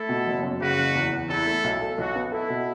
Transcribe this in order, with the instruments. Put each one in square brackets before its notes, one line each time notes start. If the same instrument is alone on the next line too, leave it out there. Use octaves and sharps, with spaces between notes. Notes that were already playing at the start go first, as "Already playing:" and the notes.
Already playing: [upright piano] A3 [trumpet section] E4 A4
[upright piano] B2
F#1
F#2
[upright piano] C#3 [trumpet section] F#4 B4
[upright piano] F#1
E2
E2
[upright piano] E2 [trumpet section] E4 A4
[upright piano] A3
B1
A4
[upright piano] B1 [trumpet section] F#4
[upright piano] B3
[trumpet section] E4 [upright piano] A4
[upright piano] B2